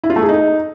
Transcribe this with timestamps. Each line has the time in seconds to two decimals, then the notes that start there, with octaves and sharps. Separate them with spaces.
0.04 E4
0.10 F4
0.16 A3
0.22 G#4
0.29 D#4